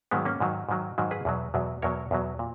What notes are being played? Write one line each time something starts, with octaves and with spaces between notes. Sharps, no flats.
G#2 D#3 F#3 G#3 B3
A#3 C#4
G#2 D#3 F#3
G#2 D#3 F#3
G#2 D#3 F#3
G#4 B4
E2 B2 F#3
E2 B2 F#3
E2 B2 F#3 A#4 C#5
E2 B2 F#3
A#2